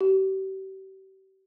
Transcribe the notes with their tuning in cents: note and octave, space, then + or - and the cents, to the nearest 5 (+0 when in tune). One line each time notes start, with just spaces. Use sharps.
G4 -40